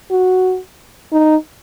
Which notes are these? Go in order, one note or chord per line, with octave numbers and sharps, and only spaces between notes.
F#4
D#4